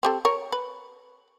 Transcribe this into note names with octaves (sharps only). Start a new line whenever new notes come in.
C4 G4 A4
A#4 C#5
B4